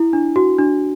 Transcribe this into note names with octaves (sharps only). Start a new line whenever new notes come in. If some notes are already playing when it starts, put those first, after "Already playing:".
Already playing: E4
D4
F#4
D4